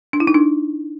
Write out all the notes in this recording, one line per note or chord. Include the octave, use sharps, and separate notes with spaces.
D4
E4
D#4
D4